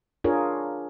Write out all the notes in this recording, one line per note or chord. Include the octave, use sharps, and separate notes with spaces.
D4 F4 G#4 A#4 C#5